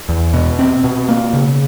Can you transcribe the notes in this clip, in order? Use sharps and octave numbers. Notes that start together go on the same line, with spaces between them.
E2
B2
C4
B2
A#3
C#3